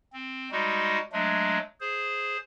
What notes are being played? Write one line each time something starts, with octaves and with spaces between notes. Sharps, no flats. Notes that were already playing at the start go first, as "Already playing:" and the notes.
C4
G3 G#3 D#4 F#4
F#3 G#3 A3 D4
G#4 C5